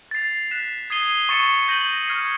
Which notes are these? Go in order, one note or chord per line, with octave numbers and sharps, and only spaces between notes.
A6 C7 F7
F#6 B6 E7
D#6 G#6 C7 D#7 G7
C#6 E6 A6 C#7 E7
G6 A#6 D#7 F#7
C#6 F6 G#6 C7 D#7